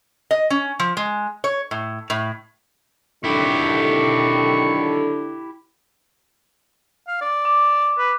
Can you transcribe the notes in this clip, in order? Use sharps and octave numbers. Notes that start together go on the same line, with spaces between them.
D#5
C#4
F3
G#3
C#5
A2
A2
D3 D#3 F#3 E4 G4 A4 C#6
F5
D5
D6
B4